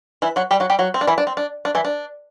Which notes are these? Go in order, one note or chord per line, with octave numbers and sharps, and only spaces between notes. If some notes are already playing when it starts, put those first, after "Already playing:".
E3 E4
F#3 F#4
G3 G4
F#3 F#4
G3 G4
F#3 F#4
C4
D4
E3 E4
D4
C4
D4
D4
E3 E4
D4